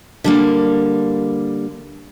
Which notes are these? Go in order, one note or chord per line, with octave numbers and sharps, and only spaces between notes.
D3 G3 A#3